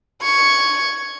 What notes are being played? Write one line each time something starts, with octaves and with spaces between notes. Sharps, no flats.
C#6 G#6